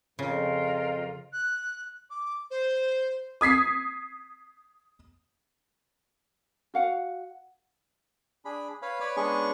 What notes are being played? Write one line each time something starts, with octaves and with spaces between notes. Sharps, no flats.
F2 C#3 F4 A#4
F#6
D6
C5
D#6 G#6 B6 C7
F#4 F5 F#5
D4 G#4 B5
B4 C#5 F5 B5
B4 C#5 D5 B5
G#3 B3 C#4 D4 G#4 C#6